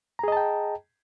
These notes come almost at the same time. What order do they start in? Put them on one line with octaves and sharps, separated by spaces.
A#5 G#4 D#5 A5 G5